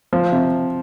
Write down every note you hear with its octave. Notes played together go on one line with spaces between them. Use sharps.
F3
C3